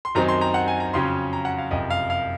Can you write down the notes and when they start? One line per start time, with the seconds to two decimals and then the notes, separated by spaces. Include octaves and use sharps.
0.05 C6
0.15 F#2 D#3 F#3 C4 D#4 A#5
0.28 C6
0.41 A#5
0.54 F#5
0.68 G#5
0.80 A#5
0.94 F2 C#3 F#3 C#4 C6
1.33 A#5
1.45 F#5
1.58 F5
1.71 F#1 F2 C3 D#5
1.90 F5
2.10 F5